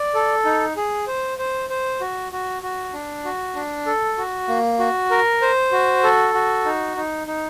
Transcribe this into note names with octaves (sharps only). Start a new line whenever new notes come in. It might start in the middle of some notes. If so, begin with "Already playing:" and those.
Already playing: D5
A4
D#4
G#4
C5
C5
C5
F#4
F#4
F#4
D4
F#4
D4
A4
F#4
A#3
F#4
A#4
C5
F#4
A4
F#4
D#4
D#4
D#4